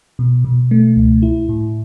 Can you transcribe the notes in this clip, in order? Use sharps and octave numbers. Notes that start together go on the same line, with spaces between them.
B2
B2
A3
C#2
E4
A2